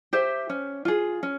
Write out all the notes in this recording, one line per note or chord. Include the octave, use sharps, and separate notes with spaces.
G4 C5 E5
C#4
F4 G#4
C#4